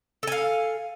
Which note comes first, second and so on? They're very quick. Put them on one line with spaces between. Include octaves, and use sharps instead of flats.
A4 G#5 F5